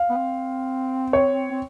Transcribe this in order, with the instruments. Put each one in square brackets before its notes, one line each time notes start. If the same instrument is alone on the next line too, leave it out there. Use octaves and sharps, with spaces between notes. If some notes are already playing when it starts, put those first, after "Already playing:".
Already playing: [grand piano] F5
[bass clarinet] B3
C4
[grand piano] C#5
[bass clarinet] C4